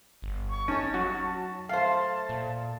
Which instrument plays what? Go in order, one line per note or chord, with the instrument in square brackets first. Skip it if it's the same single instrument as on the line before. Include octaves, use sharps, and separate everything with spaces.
[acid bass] G1
[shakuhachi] C#6
[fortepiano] C#4 [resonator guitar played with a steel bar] D#4 C#5 [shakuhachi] A5
[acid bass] F#3 [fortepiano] F#4
[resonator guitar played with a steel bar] A3 C5 [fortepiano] F5 [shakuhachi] A5
[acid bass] A#2